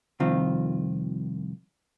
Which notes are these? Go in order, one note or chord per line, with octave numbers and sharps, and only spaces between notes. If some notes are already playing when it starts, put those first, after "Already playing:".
C2 F2 D#3 C4 F4